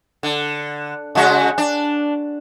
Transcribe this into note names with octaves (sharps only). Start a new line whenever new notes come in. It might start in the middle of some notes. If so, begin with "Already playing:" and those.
D3
C#3 G#3 F#4
D4